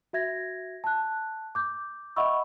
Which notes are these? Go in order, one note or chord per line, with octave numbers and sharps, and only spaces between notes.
F#4 E5 G#6 A#6
A5 F#6
D6 G6
D#5 E5 F#5 B5 C#6 E6